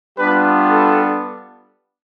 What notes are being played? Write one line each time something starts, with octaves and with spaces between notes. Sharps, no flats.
G3 B3 D4 F4 G4 B4
A4